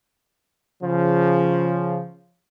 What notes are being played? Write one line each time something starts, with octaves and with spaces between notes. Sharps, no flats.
C#3 F3